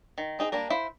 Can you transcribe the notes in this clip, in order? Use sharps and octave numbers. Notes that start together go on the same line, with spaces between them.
D#3
C4 D#4 G#4
G3 A#3 D4 A#4
E4 C5 F5